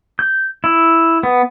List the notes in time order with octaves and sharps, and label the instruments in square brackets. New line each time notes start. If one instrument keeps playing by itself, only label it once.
[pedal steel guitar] G6
E4
B3